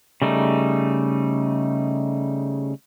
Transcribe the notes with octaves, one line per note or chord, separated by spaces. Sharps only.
C#3 G3 A3 D#4